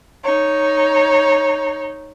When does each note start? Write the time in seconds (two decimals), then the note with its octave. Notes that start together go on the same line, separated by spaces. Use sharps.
0.24 D#4 C#5